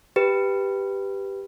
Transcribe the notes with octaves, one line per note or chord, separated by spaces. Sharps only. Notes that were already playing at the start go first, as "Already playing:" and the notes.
G4 B4